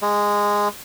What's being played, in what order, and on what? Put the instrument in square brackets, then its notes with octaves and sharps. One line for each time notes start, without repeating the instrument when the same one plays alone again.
[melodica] G#3